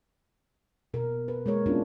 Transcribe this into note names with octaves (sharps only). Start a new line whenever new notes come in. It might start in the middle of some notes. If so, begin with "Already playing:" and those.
B2 A#4
B4
G#3 A#3 A#4 C#5
A#3 B3 C#4 D4 E4 F4